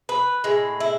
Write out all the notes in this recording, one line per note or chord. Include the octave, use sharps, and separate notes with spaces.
B4
A2 G#3
E4